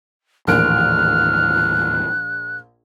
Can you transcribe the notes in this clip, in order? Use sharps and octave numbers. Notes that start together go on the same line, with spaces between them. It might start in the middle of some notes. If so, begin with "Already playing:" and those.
A#1 D#2 A2 E3 A#4 F6 F#6 D7